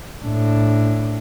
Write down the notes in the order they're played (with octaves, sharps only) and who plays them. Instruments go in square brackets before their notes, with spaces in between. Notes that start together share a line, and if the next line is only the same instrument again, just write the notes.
[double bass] A2 D4